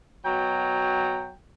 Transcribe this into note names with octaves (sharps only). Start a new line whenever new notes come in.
B2 F#3 G5 A#5